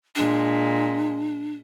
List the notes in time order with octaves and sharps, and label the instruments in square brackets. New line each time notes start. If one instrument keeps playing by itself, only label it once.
[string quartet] A#2 G#3 [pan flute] D4